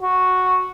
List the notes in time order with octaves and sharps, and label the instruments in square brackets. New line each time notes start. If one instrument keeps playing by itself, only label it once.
[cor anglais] F#4